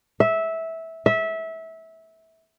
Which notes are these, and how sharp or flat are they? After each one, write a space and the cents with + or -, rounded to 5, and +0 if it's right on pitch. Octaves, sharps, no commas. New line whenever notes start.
E5 -15
E5 -20